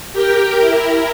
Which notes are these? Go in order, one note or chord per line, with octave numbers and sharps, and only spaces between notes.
G4 A#4 G5
E4 A#4